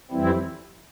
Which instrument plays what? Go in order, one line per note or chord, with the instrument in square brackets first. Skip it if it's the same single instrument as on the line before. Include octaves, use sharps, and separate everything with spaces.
[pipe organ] F2 E3 G3 C4 E4